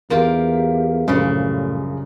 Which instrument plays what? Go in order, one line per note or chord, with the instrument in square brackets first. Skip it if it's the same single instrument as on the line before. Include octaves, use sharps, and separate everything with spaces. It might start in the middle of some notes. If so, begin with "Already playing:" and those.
[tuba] E2 [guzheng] A#3 F4 G4 [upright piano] A#4 F5
[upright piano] A#1 F#2 C5 [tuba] A2 [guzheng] C#3 G3